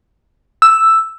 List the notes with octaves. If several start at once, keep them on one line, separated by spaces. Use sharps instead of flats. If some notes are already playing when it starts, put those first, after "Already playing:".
E6